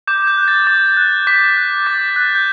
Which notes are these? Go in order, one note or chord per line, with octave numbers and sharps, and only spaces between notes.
D6 G6
G6
F#6
A6
D6 A6
F#6
D6 B6
F#6
D6 A6
F#6
G6